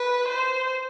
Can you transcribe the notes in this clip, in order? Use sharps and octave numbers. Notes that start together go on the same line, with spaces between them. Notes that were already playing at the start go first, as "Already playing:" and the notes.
Already playing: B4
C5